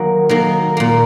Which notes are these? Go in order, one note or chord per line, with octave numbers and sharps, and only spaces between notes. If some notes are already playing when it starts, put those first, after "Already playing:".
Already playing: D#3 F#3 A#3
D#3 F#3 A#3
A#2 A#3